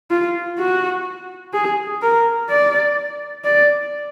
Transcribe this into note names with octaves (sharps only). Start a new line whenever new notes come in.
F4
F#4
G#4
A#4
D5
D5